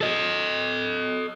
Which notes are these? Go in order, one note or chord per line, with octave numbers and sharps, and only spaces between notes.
A4 D#5